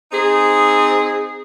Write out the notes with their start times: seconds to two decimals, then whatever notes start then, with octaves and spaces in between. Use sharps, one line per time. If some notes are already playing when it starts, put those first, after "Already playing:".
0.12 C4 D#4 G#4